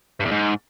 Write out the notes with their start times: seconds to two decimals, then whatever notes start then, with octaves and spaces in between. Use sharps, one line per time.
0.20 G2
0.26 E2
0.31 G#2